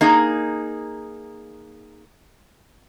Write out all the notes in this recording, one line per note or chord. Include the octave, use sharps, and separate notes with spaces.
A#3 D#4 G#4